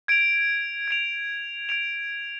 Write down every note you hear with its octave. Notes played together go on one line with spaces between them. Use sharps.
G#6 D7 F7
G#6 D7 F7
G#6 D7 F7